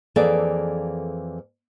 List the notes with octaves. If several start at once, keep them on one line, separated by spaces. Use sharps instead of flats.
F2 E3 A#3 G#4 A4 D5